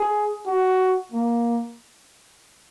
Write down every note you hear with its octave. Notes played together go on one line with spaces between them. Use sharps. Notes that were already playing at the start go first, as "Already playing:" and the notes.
Already playing: G#4
F#4
A#3